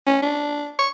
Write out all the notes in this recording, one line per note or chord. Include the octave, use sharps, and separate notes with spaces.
C#4
D4
C#6